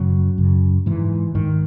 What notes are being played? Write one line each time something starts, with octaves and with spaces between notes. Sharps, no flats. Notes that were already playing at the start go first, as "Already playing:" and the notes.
Already playing: F#2 C#3 F#3
F#2 C#3
G#2 E3
G#2 D#3